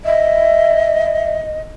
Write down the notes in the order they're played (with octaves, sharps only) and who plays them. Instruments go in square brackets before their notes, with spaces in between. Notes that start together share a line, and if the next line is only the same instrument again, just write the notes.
[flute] D#5 [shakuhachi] E5